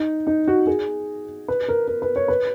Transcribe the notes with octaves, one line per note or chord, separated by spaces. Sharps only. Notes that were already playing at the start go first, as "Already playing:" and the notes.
Already playing: D#4
D#4
F#4
G#4
B4
A#4
A#4
B4
C#5
B4